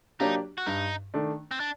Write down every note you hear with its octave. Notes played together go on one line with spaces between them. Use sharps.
F#3 A#3 D4 D#4 G4
F#4
G2 D#4
D#3 A3 D4
C4
D4